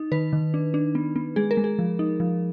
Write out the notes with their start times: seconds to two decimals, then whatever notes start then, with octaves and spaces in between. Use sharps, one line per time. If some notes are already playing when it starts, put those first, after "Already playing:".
Already playing: D#4
0.12 D#3 B4
0.33 D#3
0.54 D4
0.74 D4
0.95 B3
1.16 B3
1.36 G#3 G#4
1.51 A#4
1.57 G#3
1.64 G#4
1.79 F3
1.99 D#4
2.20 F3